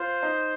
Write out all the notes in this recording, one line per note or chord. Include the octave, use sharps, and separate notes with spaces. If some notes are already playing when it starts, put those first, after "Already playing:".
Already playing: F4 C5
D#4